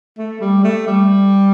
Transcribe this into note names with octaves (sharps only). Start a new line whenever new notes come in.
A3
G3
A3
G3